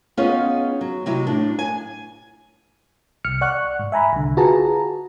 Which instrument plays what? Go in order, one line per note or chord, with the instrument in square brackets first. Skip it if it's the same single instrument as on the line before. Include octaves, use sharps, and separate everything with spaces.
[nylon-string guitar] B3 C#4 D#4 F4 G#4 C#5
F#3
C3 F#3 D#4 E4
A2 D4
G#5
[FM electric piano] C2 F6 C#7
D5 F#5 C#6 F#6
G#2
E5 G#5 A#5 B5
C2 D3
F4 F#4 G#4 B4 A5 A#5